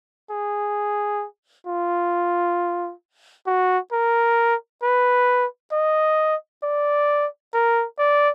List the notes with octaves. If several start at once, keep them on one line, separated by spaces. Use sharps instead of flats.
G#4
F4
F#4
A#4
B4
D#5
D5
A#4
D5